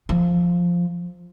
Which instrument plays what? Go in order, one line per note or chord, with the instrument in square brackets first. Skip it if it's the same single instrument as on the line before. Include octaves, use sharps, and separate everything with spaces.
[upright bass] F3